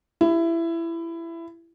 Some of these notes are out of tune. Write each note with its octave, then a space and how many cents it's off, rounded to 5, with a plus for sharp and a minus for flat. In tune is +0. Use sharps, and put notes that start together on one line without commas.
E4 +20 G4 +0